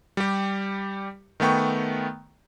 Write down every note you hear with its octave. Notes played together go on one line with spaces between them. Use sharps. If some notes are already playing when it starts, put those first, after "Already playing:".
G3 G4
D#3 A3 B3 G5 C#6